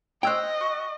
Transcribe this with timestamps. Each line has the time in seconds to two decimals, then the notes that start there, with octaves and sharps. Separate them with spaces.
0.23 C5 C#5 D#5 G5 E6 F#6
0.61 F#4